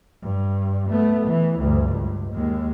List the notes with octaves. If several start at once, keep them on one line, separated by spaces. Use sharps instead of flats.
G2
A3 B3
E3
D2 G2
C#2
D#2 G#3